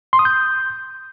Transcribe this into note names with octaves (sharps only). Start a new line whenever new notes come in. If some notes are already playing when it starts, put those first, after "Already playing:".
C6
D#6
G6